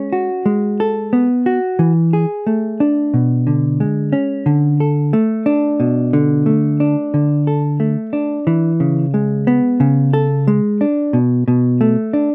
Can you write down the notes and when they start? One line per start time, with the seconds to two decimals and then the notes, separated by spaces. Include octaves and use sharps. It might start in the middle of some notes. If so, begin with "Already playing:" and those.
Already playing: G#3 C#4
0.13 F#4
0.46 G#3
0.80 A4
1.13 B3
1.46 F#4
1.79 E3
2.13 G#4
2.47 A3
2.80 D4
3.14 B2
3.47 D3
3.80 G#3
4.13 C#4
4.46 D3
4.80 A4
5.13 A3
5.46 D4
5.80 B2
6.13 D3
6.46 A3
6.80 D4
7.14 D3
7.47 A4
7.80 A3
8.13 D4
8.47 E3
8.80 C#3
9.14 G#3
9.47 B3
9.80 C#3
10.13 A4
10.48 G#3
10.81 D4
11.13 B2
11.48 B2
11.81 A3
12.13 D4